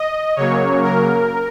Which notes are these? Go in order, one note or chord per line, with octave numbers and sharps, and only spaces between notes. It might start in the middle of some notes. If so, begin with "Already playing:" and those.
Already playing: D#5
C#3 F#3 A#3 C#5
A#4